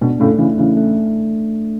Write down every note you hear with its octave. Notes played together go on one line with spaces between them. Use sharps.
B2 D4
A2 C#3 A3
C#3 E3 A3
C#3 E3 A3
A3